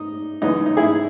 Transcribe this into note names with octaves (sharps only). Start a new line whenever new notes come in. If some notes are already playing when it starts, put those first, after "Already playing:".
Already playing: D#4
F#2 C#3 E3 G#3 B3 D#4
D#4
E4 G#4